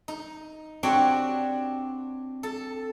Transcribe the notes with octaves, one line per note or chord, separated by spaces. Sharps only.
D#4
C4 D4 F#4 G4 C#5 G5
A4